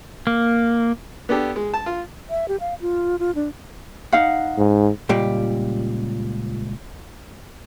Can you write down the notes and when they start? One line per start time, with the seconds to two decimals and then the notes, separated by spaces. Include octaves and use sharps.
0.27 A#3
1.29 B3 D4 G4 A4
1.56 G#3
1.74 A5
1.86 F4
2.30 E5
2.48 G4
2.60 F5
2.81 F4
3.19 F4
3.35 D4
4.12 D#4 F5 F#5
4.58 G#2
5.09 C#2 A#2 G3 G4